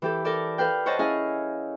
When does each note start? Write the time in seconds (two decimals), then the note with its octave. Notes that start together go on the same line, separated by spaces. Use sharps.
0.02 E3 G4 A4
0.24 A4 A#4 D5 A5
0.58 A4 B4 F5 G5
0.86 C5 C#5 D#5 F#5 A5
0.99 C#4 E4 G#4 D#5 F5 G#5